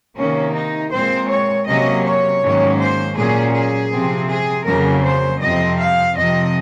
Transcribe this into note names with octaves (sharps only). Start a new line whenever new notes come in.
C3 D#3 A#3 C#4
D#4
A#2 G#3 C4 C5
C#5
C3 F#3 A#3 C#4 D#5
C#5
G#2 D#3 F#3 A#3 C#4
C5
A#2 F#3 A#3 C#4 G#4
G#4
C3 F3 C4
G#4
F2 C#3 F#3 A#3 C#4 A#4
C5
F2 C3 F3 C4 D#5
F5
F2 C3 F3 C4 D#5